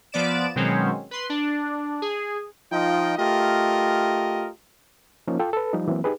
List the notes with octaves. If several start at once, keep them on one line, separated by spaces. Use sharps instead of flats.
F3 B3 D5 D7 E7
B2 D#3 F#3 G#3 C4 C#4
B4 C6
D4
G#4
F3 D#4 F4 D#5 G5
A3 F4 G4 A#4 D#5
F3 A#3 C#4 D#4
F4 A4 G5
A4 B4
F3 G3 D#4
E3 F#3 A#3 C4
D#4 G4 G#4 B4